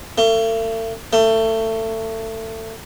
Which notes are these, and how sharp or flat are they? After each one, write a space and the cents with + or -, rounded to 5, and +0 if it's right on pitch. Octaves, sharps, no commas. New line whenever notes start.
A3 +40
A3 +25